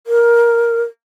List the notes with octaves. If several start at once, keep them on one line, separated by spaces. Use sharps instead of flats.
A#4